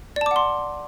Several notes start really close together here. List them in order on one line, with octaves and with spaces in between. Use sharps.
D5 A5 D6 F#5 C6